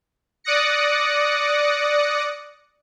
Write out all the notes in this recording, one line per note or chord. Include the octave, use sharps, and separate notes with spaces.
D5 D6 D#6 F#6 A#6 C#7